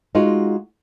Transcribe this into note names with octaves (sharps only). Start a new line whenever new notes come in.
G#3 D#4 F4 F#4